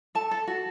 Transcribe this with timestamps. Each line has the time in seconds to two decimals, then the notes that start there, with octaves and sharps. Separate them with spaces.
0.15 A4 A5
0.31 A4
0.47 F#4